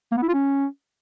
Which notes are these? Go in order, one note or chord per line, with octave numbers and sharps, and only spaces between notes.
A#3
B3
E4
F4
C#4